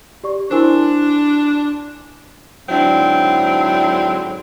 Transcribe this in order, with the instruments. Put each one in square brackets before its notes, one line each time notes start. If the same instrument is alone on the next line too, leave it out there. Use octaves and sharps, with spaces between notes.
[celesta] G4 D5 C#6
[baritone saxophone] D4 [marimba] E4 A#4 C5 [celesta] F#4 G#5 C6
[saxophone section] G#2 D3 F#3 C4 D4 E4